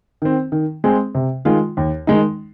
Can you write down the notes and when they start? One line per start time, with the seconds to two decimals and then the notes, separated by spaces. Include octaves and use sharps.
0.22 D#3 C4
0.52 D#3
0.84 G#3 C4 G#4
1.15 C3
1.45 D#3 G#3 F4
1.77 D#2
2.07 D#3 G#3 D#4